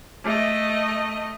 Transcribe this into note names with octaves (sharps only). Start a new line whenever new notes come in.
A3 D#5